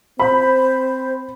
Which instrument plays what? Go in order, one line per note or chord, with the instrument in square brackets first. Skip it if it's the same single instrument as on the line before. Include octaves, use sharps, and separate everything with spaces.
[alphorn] C4 [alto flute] C5 [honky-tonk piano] B5